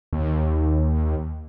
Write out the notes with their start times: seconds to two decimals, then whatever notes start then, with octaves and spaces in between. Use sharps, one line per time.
0.13 D#2